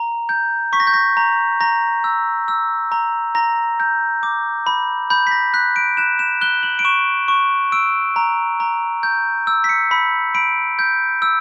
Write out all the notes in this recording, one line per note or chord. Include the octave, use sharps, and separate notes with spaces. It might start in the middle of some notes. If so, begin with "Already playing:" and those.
Already playing: A#5
G6
C#6 B6
A#6
G6
A#6
A#5
A#5 A#6
E6
E6
A#5
A#5 A#6
G6
D6
B5
B5 G6
B6
A#6
F#6 B6
D7
F#6 E7
E7
F#6 G7
F#7
D7
C#6 E7
C#6
E6 D7
A#5
A#5
G6
E6
B6
C#7
B5 B6
B5 D7
G6
E6